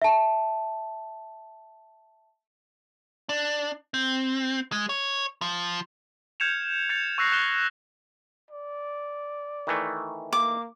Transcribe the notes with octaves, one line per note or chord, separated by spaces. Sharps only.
E5 A5
D4
C4
G#3
C#5
F3
F6 G6 G#6 C#7 E7 F7
G6 A6 C#7 F7
C#6 E6 F#6 A#6 C7
F#6 E7 G7
D5
D#3 E3 A3
A#3 D6